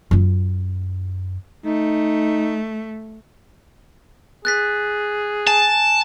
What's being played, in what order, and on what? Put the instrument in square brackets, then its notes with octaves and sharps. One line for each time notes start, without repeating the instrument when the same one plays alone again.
[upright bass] F#2 F4
[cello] A3 [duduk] D#4
[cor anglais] G#4 [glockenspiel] F#6 A6 B6
[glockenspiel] G#5 [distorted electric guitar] A5